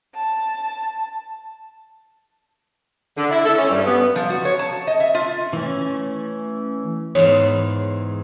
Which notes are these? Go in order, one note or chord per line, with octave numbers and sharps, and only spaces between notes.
A5
D3
E4
A4
C#4
G2
B3
F3
F#4
C#5
A5
D#5
E5
F4
E3 A3 C#4
E2 G#2 C#5